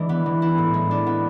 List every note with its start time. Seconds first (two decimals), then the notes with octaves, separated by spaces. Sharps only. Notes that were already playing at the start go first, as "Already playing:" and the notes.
Already playing: E3 G#3 D4
0.09 B3
0.26 E3
0.42 E4
0.58 A2
0.74 G#3
0.91 D4
1.07 B3